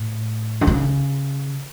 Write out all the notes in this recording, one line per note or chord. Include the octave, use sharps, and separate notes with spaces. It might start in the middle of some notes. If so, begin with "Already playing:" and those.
Already playing: A2
D3
C#3